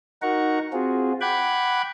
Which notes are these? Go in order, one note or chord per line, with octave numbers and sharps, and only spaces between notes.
D#4 F#4 A#4 F#5 A#5 C#6
C4 F4 F#4 G#4
F#5 G5 B5 D6 F#6 G#6